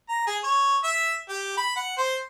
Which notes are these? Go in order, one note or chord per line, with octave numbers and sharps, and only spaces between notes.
A#5
G#4
C#5
E5
G4
B5
F#5
C5